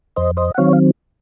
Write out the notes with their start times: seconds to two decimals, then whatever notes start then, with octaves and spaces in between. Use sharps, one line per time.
0.16 F2 C5 D#5
0.37 C5 D#5
0.54 F#5
0.58 D#3 F#3 C4 C#5 F5
0.73 F5